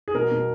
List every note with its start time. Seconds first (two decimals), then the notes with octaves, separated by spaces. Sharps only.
0.08 G#4
0.14 B2 A#4
0.32 B2